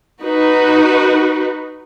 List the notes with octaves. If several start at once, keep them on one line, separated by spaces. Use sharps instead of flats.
D#4 F#4 B4